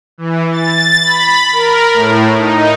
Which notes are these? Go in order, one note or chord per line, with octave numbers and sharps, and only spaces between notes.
E3
A6
B5
A#4
A2
D#4